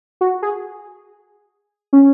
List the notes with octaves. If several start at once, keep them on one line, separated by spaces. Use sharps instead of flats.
F#4
G#4
C#4